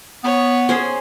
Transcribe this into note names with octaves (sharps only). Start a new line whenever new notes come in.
B3 C#5
C#4 G#4 C5